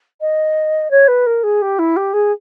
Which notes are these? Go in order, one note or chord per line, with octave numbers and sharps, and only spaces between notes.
D#5
C#5
B4
A#4
G#4
G4
E4
G4
G#4